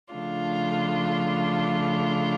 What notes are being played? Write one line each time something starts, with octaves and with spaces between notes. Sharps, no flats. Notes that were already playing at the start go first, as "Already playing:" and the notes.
C#3 F3 A3 D4 F4